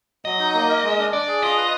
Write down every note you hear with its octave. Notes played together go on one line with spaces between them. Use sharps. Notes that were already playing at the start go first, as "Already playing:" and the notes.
F#3 D#5
D#4
A#3
A#4
G#3
D4
D4 D5
G#4
F4 D#5
B4